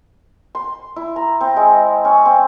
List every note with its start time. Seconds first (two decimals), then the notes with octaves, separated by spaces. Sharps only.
0.55 C6
0.96 E4
1.16 A#5
1.41 C4
1.56 G#3
2.05 C#4
2.25 C4